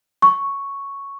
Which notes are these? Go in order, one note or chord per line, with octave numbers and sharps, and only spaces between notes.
C#6